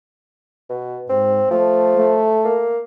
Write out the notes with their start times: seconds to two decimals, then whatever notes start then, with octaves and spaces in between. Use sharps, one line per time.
0.70 B2
1.09 G#2 C4
1.51 F3 A3
1.99 A3
2.45 A#3